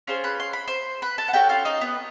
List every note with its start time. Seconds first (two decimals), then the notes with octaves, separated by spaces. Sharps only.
0.07 C#4 F4 G#4 C5 C6
0.24 B4 B5
0.40 C6
0.53 B5
0.68 C5 C6
1.02 B4 B5
1.18 A4 A5
1.28 F#5
1.33 C#4 F#4 G4 A4 G5
1.49 F4 F5
1.65 D#4 D#5
1.81 B3 B4